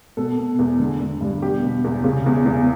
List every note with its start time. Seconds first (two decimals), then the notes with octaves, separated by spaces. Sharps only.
0.17 B2 A4
0.38 B2
0.59 E2
0.80 D3
1.01 D3
1.21 G2
1.42 B2 G4
1.64 B2
1.84 E2
2.04 C#3
2.26 E2
2.46 E2